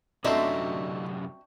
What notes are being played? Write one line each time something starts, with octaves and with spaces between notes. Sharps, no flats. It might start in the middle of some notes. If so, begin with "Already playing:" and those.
F#2 C3 A3 C4 D4 D#4 F#4 E5